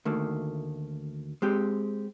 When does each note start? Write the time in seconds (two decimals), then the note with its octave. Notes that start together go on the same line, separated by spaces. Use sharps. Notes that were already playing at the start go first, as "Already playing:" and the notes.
0.05 D2 D#3 A3 A#3
1.42 G#3 C4 G4